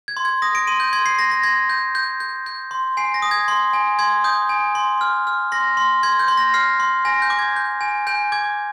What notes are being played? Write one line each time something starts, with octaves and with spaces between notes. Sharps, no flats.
G#6
C6
G#6
D#6 A#6
D7
C6 D#7
G6
C6 G#6
C7
C6 A#6
A#6
C6 G#6
G6
G6
G6
G6
C6
G#5 C7
A#6
D#6
G#6
C6
G#5
C6 G#6
D#6 G6
G#5
C6
F6
F6
C6 A#6
C6
C6 G#6
G6
C6
A#6
F6 C7
C6
G#5 A#6
G6
D6
G#6
G6
G#5
G#5 G6
D6 G#6